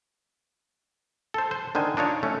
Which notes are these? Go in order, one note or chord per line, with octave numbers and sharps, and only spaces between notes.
A4 C5
C5
D3 D#3 C5 G#5
D4 D#4 F4 C#5
A3 C#4